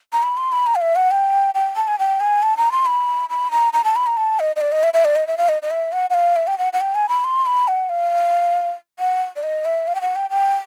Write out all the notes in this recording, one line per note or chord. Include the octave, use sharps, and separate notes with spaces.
A#5
B5
C6
B5
A#5
F5
E5
F#5
G5
G5
A5
G#5
G5
G#5
A5
A#5
C6
B5
B5
A#5
A#5
A5
B5
A#5
A5
D#5
D#5
D5
D#5
E5
E5
D5
D#5
E5
F5
D#5
D#5
E5
F#5
F#5
F5
E5
G5
F#5
F#5
G5
G#5
B5
C6
B5
F#5
F5
F#5
D5
D#5
E5
F5
G5
F#5
G5
G5